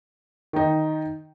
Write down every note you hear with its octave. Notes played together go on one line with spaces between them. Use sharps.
D#3 D#4